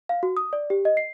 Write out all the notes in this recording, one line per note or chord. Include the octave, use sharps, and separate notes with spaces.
F5
F#4
D#6
D5
G4
D#5
C7